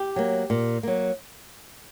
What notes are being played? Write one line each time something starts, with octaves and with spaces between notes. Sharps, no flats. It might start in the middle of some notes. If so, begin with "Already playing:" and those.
Already playing: G4
F#3 A#3
A#2
F#3 A#3